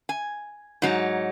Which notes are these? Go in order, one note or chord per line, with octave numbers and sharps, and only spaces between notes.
G#5
G#2 F#3 D#4